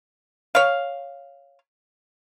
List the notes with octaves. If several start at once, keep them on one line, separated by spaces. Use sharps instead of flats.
C#5 F5